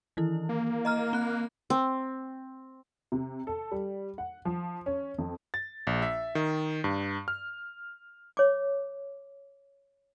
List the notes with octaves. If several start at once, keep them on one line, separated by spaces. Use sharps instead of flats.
D#3 E3 E4
A#3
D#5 A#5 F6
C4 F#6
C4
C3
A4
G3
F#5
F3
C#4
F2
A6
A#1
E5
D#3
G2
F6
C#5 D6